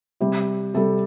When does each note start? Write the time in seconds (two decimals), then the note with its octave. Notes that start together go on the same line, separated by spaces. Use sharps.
0.20 C3 G3
0.74 C3 G3 A4